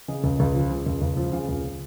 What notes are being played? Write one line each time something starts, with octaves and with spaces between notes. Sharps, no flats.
C#3 D#5
C#2
C#2
F3
C#3
C#2
C#2
F3
C#3 F5
C#2